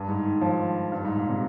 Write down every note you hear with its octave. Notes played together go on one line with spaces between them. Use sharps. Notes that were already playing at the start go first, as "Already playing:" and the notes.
Already playing: G2
G#2
D#3
F3
G2
G#2
A#2
C3